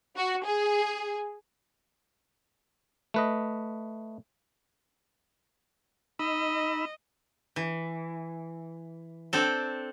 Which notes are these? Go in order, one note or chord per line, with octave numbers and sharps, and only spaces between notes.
F#4
G#4
A3 B4 D#5
D#4 D#5 B5 E6
E3
C4 D4 A4